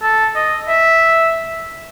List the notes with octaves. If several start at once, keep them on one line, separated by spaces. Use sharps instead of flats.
A4
D#5
E5